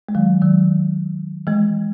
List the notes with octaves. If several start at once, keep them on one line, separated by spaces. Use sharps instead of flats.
G#3
D#3 F#3
D#3 F#3
E3 G#3